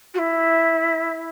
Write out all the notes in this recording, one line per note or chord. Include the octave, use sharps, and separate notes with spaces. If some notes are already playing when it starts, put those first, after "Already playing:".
F#4
E4